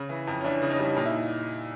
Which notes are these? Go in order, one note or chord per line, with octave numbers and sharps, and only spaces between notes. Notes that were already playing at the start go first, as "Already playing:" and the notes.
Already playing: C#3 C#4
E3
F2
C#4
E3 D4
C#3
C#4 D#4
G3
A#2 D#4
E4